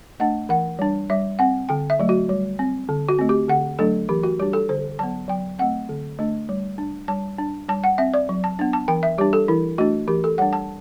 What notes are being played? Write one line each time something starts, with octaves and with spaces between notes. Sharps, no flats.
A3 D4 F#5
E3 F#5
G3 D4
G3 E5
C4 F#5
D3 G5
E5
F#3 A3
F#4
G3
C4
D3
F#4
A3 C4
G4
D3 F#5
F#3 A3 D4 A4
E3 G4
F#4
G3 D4 G4
A4
D3 C5
F#3 B3 A5
F#3 G5
A3 C4 F#5
D3
A3 D4
G3
D4
G3 A5
D4
G3 A5
F#5
C4 E5
D5
F#3
A5
B3 D4
A5
E3 G5
E5
G3 D4 G4
A4
E3 E4
A3 D4 F#4
E3 G4
A4
G3 D4 F#5
A5